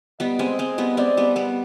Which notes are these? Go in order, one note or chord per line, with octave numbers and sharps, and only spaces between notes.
G3 B3 D#5
G#3 C4
G#3 C4
G3 B3
G#3 C4 D5
G3 B3
G3 B3